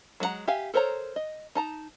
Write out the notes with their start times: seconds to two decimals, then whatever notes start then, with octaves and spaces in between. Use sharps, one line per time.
0.20 F#3 G#3 C#4 F#5 A#5
0.48 G4 E5 F5 G#5
0.74 A4 A#4 C5 C#5 A#5
1.16 D#5
1.55 D#4 A5 A#5